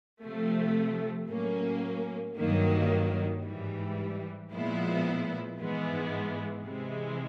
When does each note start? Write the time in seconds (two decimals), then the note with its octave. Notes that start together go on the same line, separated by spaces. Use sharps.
0.23 C3 F3 A3
1.30 A2 F#3 A#3 C#4
2.37 G2 D#3 F#3 A#3
3.44 G#2 E3 G3
4.51 A#2 F3 G#3 B3 E4
5.58 G#2 E3 G#3 B3
6.66 C3 E3 G#3